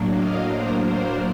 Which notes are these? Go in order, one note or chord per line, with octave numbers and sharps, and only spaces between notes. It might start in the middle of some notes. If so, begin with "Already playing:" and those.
Already playing: A2 F#3 A#3 D4
D#5 F5
A#4 C5
A#4 C5